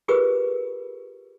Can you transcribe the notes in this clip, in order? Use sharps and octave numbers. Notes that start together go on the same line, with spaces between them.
F4 G4 G#4 A#4 B4 D#6